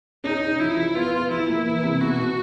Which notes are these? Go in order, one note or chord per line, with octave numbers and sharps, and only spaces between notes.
C#4 D#4
C#4
F3 E4
F3
B3 F4
B3
F3 E4
A#3
E3
C3
B2 F#4
B2